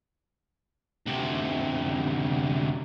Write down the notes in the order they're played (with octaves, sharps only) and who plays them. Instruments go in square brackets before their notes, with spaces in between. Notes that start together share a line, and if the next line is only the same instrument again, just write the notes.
[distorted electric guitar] D2 C3